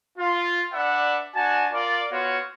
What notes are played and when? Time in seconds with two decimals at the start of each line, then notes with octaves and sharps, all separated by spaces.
0.18 F4
0.72 D4 B4 D5 E5 F#5
1.34 D4 F#4 G#5 A5
1.72 F4 A#4 D5
2.11 B3 F4 F#4 C#5 F5